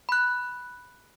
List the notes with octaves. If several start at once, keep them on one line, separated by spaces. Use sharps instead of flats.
B5 F#6